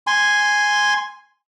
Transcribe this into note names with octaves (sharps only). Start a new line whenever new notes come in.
G#5 C6